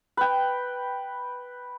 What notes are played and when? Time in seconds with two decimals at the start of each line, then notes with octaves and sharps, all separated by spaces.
0.17 B4 G5